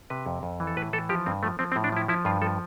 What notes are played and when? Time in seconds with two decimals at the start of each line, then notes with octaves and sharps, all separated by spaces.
0.10 C3 B4
0.26 F2
0.43 F2
0.60 E3
0.67 A4
0.77 A2 B4
0.93 E3 A4
1.09 F3 G4
1.26 G2 C4
1.43 F3 A3
1.59 F3 C4
1.72 C4
1.76 A2
1.84 D4
1.92 F3 E4
2.08 F3 E4
2.25 G2 F4
2.42 F3 A4